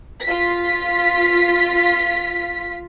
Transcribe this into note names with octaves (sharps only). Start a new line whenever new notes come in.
F4 B6